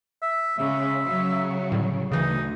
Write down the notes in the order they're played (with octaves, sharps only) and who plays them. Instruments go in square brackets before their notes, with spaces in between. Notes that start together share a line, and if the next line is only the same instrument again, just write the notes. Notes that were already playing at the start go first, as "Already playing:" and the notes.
[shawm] E5
[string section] C#3 G#3 [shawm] E5
[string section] C#3 F#3
[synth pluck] A2 D3 G3
[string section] D2 [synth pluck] C#3 E3 [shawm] D#4